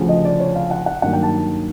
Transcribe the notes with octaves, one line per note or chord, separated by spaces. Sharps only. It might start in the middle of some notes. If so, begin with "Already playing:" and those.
Already playing: D2 C#3 F3
D#5
D5
C#5
F5
F#5
F#5
G2 D#3 F#3 A#3 F#5
G5
A5